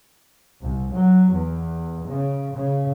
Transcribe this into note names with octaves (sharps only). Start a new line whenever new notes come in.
C2
F#3
E2
C#3
C#3